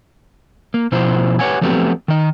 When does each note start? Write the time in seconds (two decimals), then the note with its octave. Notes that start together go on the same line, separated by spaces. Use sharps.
0.74 A#3
0.92 B2 F3 E4 C5
1.39 G4 B4 C#5 F#5 G#5
1.61 F3 F#3 A3 B3 C4 G4
2.08 D#3 D#5